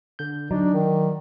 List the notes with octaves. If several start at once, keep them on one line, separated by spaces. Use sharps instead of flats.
D3 G6
F#3 D4 D#4 F#4 D5
D#3